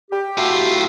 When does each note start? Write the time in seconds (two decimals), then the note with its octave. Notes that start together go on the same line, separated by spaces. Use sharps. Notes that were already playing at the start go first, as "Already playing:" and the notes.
0.11 G4
0.38 A2 F4 F#4 E5